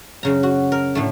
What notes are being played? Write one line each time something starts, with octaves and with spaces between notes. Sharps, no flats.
F#2 C#3 A#5
F#4
A#4
A2 D3 A3